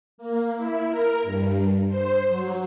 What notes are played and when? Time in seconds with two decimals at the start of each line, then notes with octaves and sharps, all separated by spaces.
0.18 A#3
0.56 E4
0.89 A#4
1.23 G2
1.89 C5
2.29 F#3